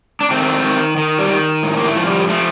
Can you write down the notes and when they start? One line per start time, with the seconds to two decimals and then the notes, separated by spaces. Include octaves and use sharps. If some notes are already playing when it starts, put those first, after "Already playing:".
0.21 D4
0.31 D#3 A3 C4
0.64 D#3
0.97 D#3
1.18 G3
1.29 D#3
1.63 A2
1.77 A#3
1.86 A3
1.96 F3
2.07 G3
2.29 F3 A3